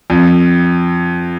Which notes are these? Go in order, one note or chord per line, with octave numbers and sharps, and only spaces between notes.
F2